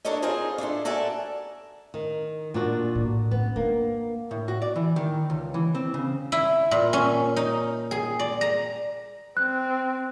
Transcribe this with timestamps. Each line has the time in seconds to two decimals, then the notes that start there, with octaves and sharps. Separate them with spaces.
0.05 D4 E4 A4 A#4 C#5 D#5
0.22 C4 D#4 F4 G#4 A#4 C5
0.58 D4 E4 F4 A4
0.85 F#4 A4 A#4 D5 E5 G#5
1.94 D#3
2.54 A#2 D4 F#4
2.95 A2
3.31 F#2 B3
3.56 A#3 D4
4.31 A2
4.48 F#4
4.62 D5
4.76 E3
4.96 D#3
5.30 C#2
5.54 E3
5.75 C4
5.94 C#3
6.32 E4
6.71 A#2
6.93 C#4
7.36 D#4
7.91 G#4
8.19 D5
8.41 A#5
9.37 C4 F#6